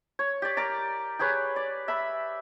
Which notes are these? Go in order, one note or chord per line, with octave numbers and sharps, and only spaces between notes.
C#5
G4 D5
A#4 D5 A#5
G4 G#4 B4 C#5
D5
E5 B5